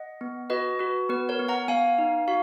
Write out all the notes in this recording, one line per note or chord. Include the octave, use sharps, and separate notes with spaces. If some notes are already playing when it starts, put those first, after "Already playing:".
Already playing: D#5 F#5
B3
F#4 B4 D#5
F#4 B4
B3 B4
A#4 C#5
B3
F#5 A#5
B3 F5 G#5
D#4
F#4 F5